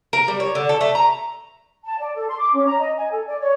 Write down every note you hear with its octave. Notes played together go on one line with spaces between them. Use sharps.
A#4
G3
C#5
D3
A4
A3
A#5
A5
D5
A4
C6
D6
C#4
A#5
D#5
G#5
A4
D5
C#5